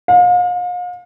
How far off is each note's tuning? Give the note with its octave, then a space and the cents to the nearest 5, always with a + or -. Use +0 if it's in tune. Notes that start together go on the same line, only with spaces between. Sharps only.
F5 +40